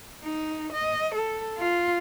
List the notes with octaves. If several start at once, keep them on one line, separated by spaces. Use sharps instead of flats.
D#4
D#5
A4
F4